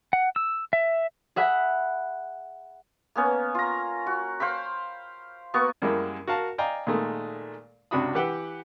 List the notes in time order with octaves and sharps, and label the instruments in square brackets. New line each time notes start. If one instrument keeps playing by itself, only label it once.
[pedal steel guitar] F#5
E6
E5
[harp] G#4 E5 F#5 B5
[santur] A#3 B3 C#4
F4 A#5
F#4
C5 F5 G5 B5
A#3 B3 F#4 C#6
[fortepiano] F#2 G3 G#3 A#3 E4
F#4 A#4 F5 A5
D5 D#5 F5 G5 G#5 A#5
A#2 D#3 G#3 A3
C#2 C3 D4 F#4 B5 D#6
E3 G4 B4 F#5 G5 E6